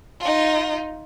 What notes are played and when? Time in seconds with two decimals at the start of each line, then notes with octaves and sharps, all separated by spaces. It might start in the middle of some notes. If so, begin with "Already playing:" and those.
0.20 D#4 F4